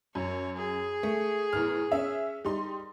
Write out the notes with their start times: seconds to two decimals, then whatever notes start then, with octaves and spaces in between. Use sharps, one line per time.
0.15 F#2 C#5
0.56 G#4
1.03 A3
1.53 E2 A2 F6
1.92 C#4 E5
2.45 G3 D#4 C6